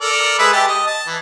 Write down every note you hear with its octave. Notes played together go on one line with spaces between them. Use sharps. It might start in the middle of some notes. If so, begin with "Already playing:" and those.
A4 A#4 D5
G#3 B4 E5
G4 A5
D#5
A5
E3